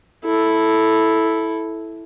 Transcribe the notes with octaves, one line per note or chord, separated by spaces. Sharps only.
E4 A4